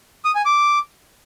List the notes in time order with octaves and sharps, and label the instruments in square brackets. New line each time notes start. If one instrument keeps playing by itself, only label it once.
[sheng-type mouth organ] D#6
G#5
D6